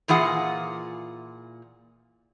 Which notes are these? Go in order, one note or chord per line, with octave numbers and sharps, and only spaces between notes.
A#2 E3 F4 G#4 F#5